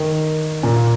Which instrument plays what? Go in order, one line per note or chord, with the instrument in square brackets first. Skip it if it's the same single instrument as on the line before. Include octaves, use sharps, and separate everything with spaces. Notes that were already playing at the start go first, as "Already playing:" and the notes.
Already playing: [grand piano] D#3
A#2